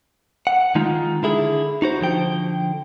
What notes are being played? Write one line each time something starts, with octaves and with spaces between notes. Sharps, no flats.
F#5
D#3 G#3 D#4 F4
D3 E4 G#4
D#4 F#4 C5
D3 F3 G5